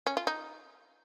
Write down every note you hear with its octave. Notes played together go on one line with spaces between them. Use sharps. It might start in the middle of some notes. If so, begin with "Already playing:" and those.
C#4
F4
D#4